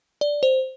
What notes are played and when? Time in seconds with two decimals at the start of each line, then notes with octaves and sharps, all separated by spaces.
0.21 D5
0.43 C5